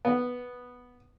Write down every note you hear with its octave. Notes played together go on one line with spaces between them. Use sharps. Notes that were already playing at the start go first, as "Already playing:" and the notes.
B3